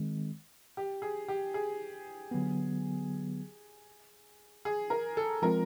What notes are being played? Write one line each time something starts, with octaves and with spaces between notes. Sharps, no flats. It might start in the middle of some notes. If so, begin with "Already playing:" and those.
Already playing: D#3 G#3 C4
G4
G#4
G4
G#4
D3 F#3 B3
G#4
A#4
A4
F3 G#3 C4 F4 A#4